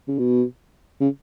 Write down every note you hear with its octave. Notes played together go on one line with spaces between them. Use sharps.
C#3
B2
C#3